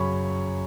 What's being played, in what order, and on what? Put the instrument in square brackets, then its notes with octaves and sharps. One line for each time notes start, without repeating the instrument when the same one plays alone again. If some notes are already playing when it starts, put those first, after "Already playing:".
Already playing: [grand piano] F#2 C#3 F#3 C#5 B5 C#6